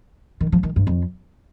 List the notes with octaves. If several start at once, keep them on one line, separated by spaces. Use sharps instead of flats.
D#3
F3
D#3
G2
F2